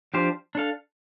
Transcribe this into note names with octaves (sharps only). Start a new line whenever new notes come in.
F3 D4 G4 C5 F5
D4 A4 F5